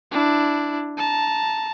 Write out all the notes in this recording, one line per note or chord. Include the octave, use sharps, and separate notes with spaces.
D4 E4
A5 A#5